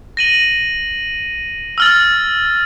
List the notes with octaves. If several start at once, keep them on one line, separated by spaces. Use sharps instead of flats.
A#6 D#7 F#7
E6 F6 A6